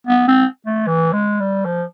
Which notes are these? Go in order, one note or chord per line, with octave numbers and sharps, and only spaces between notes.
B3
C4
A3
E3
G#3
G3
F3